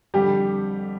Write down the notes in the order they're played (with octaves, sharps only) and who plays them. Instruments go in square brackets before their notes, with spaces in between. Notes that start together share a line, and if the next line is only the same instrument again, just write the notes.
[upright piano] F2 D3 G3 G4